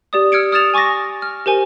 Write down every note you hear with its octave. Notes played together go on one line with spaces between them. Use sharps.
G4 D5 D#6
E6 F6 G#6 C#7 D7
D#6 F6 G#6 A6 E7 F7
G#5 C#6 D6 A6 A#6
F6
G4 A#4 C5 G#5